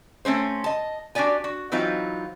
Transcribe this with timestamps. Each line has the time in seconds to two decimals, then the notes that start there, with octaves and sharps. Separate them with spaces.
0.25 A3 C4 C#4 C5
0.64 D#5 A5
1.15 D4 F#4 G4 D5 G#5
1.44 F#4
1.72 E3 F#3 C4 D#4 F4